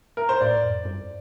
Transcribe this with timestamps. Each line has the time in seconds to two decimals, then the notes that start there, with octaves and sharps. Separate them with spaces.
0.17 A#4
0.29 C5
0.41 A2 D5
0.64 F2
0.85 G2